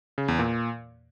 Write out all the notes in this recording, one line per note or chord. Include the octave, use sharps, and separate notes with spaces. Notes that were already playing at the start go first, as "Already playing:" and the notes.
C#3
E2
A#2